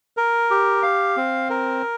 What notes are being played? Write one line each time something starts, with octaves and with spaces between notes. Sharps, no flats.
A#4
G4
F5
C4
A#4